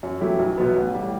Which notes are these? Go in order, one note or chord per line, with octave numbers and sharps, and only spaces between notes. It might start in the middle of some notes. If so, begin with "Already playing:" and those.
F#2
F#3 A3 E4 G4
B1
B2 F#3 B3
A1
A2 G3